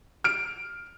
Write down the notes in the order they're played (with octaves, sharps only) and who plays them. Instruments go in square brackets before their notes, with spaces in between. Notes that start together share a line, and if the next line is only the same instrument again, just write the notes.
[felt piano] F6 D7